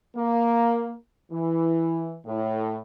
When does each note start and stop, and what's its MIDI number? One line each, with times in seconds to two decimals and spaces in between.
0.16 0.94 58
1.32 2.17 52
2.25 2.80 45